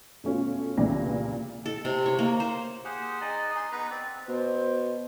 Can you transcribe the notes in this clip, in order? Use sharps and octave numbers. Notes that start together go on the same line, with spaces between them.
B2 A3 C#4 F4
C2 A#2 C#3 E3 D5 A#6
A4
C3
C#5
A#3
C5
G4 G#4 C5 F#5
D#4 G#4 D5 D#5
D#4 G#4 C6
B3 D#4 B4 A#5
C4 D5
B2 C5